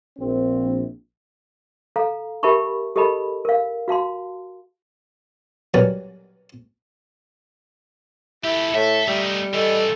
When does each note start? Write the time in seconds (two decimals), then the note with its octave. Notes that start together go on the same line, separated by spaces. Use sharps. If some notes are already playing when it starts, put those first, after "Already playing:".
0.19 A#1 C4
1.96 A4 F5 A#5
2.43 G4 A#4 E5 A5 B5 C#6
2.96 G4 A4 A#4 D#5 A5 B5
3.45 A#4 F5
3.88 F#4 F5 A5 C6
5.74 F#3 G3 C#4 A#4 B4 D5
8.44 E4 G4 A4
8.75 A2 A4 E5
9.08 G3 A3 D#4
9.54 E3 A3 A4 D#5